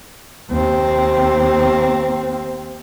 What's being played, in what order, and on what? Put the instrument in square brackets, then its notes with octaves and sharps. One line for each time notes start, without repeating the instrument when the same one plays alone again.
[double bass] D#2 C4